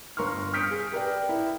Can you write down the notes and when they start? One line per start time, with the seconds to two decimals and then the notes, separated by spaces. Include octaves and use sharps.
0.17 G1 A#4 C6 C#6 F6
0.53 D#6 F6 G6 B6 C#7 D7
0.71 G#4
0.92 G4 A#4 B4 D5 G5
1.29 E4 A#4 E5